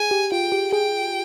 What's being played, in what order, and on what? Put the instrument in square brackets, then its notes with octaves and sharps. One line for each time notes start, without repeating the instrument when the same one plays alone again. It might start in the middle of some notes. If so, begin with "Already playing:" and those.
Already playing: [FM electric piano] G#4 [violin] G#5
[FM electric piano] G4
[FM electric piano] F4 [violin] G5
[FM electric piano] G4
[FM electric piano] G#4 [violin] G5